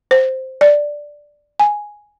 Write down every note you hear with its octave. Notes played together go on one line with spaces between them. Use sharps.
C5
D5
G#5